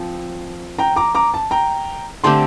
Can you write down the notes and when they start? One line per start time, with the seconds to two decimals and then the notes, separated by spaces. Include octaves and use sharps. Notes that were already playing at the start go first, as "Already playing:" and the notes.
Already playing: F3 C4
0.79 G5 A#5
0.96 A#5 D6
1.15 A#5 D6
1.34 A5
1.51 G5 A#5
2.24 D3 A3 C4 G4 A5 C6